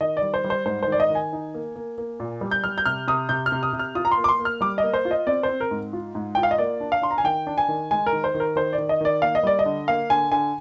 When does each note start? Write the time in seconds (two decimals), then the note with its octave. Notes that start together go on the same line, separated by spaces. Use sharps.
0.01 D#3 D#5
0.17 G3 D5
0.34 C5
0.44 G3
0.50 C5
0.66 G#2 C5
0.83 C5
0.88 D#3 D5
1.00 D#5
1.10 D#3
1.15 G#5
1.33 D#4
1.54 A#3
1.76 A#3
1.98 A#3
2.20 A#2
2.41 G3
2.51 G6
2.64 G3 F6
2.78 G6
2.86 C3 F6
3.07 C3 D#6
3.29 C3 G6
3.46 F6
3.52 C3
3.63 D#6
3.73 C3
3.79 F6
3.95 F4 D#6
4.05 A#5
4.12 C6
4.17 A#3
4.24 D6
4.29 C6
4.39 A#3
4.45 F6
4.61 G3 D6
4.78 D#5
4.83 A#3
4.94 C5
5.05 F4
5.11 D#5
5.27 C4 D5
5.43 C5
5.49 C4
5.61 A#4
5.71 G#2
5.93 F4
6.15 G#2
6.35 F4 G5
6.43 F5
6.51 D#5
6.58 A#3 D5
6.80 D4
6.92 F5
7.02 D4 C6
7.11 A#5
7.18 G#5
7.24 D#3 G5
7.47 D4
7.58 G#5
7.68 D#3
7.91 G#3 G#5
8.06 A#4
8.12 D#3
8.24 C5
8.34 D#3
8.40 A#4
8.56 D#3 C5
8.73 D5
8.78 D#3
8.89 D#5
9.01 D#3 D5
9.22 A#3 F5
9.35 D#5
9.43 G3 D5
9.59 D#5
9.66 D3
9.88 A#3 F5
10.10 D3 G#5
10.31 D3 G#5